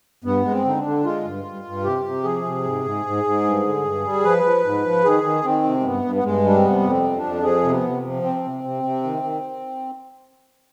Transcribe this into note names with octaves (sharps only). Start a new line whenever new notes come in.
G2 B3
G#3
C4
D3 D#4
D4
D3
G#3 F4
G2
G2
G2
C3 G4
C3
F3 G#4
C3
G#2
G#2
G#2
G#2
G2
D3
G2
G3
F3 B4
F3
G#2
F3
D#3 G#4
D#3
D#3 C4
C3
G#3
G2 B3
G2
B3
G2 G#3
G3 D4
C4
C3 B3
F2
C4
F3
D4
F2
F3 G#4
C3
B3
C3
F3
C3 C4
C3
C3
C3
D#3
D#3